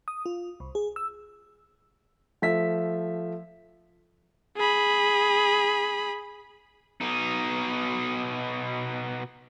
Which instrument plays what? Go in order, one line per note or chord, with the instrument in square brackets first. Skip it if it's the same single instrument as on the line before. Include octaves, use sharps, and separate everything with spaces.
[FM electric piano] D#6
F4
C2
G#4
E6
[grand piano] F3 A3 E5 B6
[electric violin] G#4 B5
[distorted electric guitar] B2 D#4